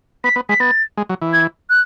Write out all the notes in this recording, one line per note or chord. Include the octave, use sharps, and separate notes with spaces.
B3 B6
B3
G#3 B6
B3 A6
G#3
F#3
E3
G#6
F#6